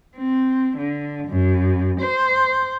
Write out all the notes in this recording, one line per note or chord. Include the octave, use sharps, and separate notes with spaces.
C4
D3
F#2
C5